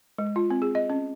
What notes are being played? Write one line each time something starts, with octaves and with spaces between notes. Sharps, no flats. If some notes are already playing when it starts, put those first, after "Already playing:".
G#3
F4
C4
G#4
D#5
C#4